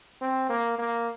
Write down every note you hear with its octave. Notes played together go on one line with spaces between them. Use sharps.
C4
A#3
A#3